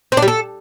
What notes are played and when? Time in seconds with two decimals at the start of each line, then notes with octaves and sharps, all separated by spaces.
0.12 C4
0.17 D4
0.22 G3
0.28 A4